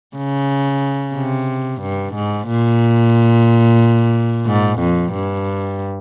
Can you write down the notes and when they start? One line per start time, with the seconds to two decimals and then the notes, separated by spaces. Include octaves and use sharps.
0.17 C#3
1.15 C3
1.81 G2
2.15 G#2
2.48 A#2
4.46 G#2
4.79 F2
5.13 G2